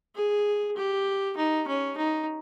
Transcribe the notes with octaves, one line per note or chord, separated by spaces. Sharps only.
G#4
G4
D#4
C#4
D#4